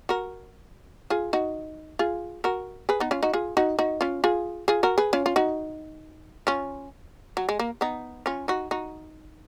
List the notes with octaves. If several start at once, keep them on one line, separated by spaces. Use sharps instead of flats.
F#4 A#4
F4 G#4
D#4 F#4
F4 G#4
F#4 A#4
G#4 B4
B3 D#4
C#4 F4
D#4 F#4
F4 G#4
D#4 F#4
D#4 F#4
C#4 F4
F4 G#4
F4 G#4
F#4 A#4
G#4 B4
C#4 F4
F4
D#4 F#4
C#4 F4
F#3
G#3
A#3
B3 D#4
C#4 F4
D#4 F#4
D#4 F#4